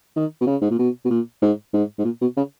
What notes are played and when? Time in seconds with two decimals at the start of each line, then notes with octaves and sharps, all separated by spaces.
0.16 D#3
0.41 B2
0.47 C#3
0.61 G#2
0.70 A#2
0.79 B2
1.05 B2
1.10 A#2
1.42 G#2
1.73 G#2
1.99 G#2
2.05 A#2
2.21 B2
2.37 C#3